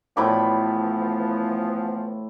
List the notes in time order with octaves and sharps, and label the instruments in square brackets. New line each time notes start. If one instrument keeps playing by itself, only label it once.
[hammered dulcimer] A2 B5 D6 [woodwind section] E3 F3 B3